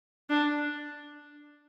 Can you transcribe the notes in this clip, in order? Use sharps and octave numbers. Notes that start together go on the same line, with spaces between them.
D4